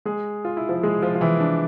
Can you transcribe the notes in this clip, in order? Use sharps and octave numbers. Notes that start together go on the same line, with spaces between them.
G#3 G#4
F4
E4
F3 F4
G#3 G#4
F3 F4
F4
E3 E4
D4